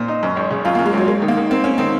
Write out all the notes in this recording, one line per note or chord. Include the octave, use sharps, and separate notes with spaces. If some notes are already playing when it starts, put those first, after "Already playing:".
Already playing: A#2 C5
D#4
F#2
G#1
C#3
F#2 F4
F#2 A#3
G#3
G#1 F#3
G#3 A#3
D#3
A#3
D#3
A#3 C4
A#3 C#4
D#3 C4